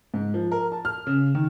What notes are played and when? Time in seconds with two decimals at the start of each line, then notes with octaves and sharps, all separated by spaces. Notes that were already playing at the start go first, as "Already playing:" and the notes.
0.14 G#2
0.34 F3
0.52 A#4
0.72 A5
0.85 F6
1.07 C#3
1.35 D#3